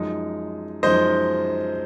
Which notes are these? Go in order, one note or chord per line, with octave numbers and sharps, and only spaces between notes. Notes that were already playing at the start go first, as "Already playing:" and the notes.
Already playing: F#2 F3 G#3 D#4
F#2 F3 G#3 D#4 C5 D#5